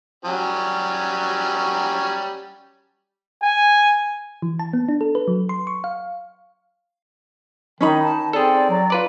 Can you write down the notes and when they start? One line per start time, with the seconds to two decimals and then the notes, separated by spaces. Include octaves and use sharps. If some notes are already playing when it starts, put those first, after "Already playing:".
0.25 F#3 G3 C#4
3.43 G#5
4.42 E3
4.59 A5
4.73 B3
4.89 D4
5.01 A4
5.15 B4
5.28 F#3
5.49 C6
5.67 C#6
5.84 F5
7.81 D#3 C#4 D#4 B5
8.02 A5
8.33 C4 G#4 A4 D5
8.70 F#3
8.90 F4 B4 D5